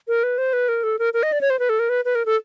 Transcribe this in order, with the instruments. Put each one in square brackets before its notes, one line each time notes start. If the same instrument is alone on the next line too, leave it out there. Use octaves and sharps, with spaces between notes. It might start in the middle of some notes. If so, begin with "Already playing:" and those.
[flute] A#4
B4
C5
B4
A#4
A4
A#4
A#4
D#5
D5
C#5
C5
B4
A4
A#4
B4
B4
A#4
A4